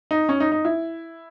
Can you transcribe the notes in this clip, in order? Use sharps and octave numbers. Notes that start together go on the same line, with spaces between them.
D#4
C#4
D#4
D#4
E4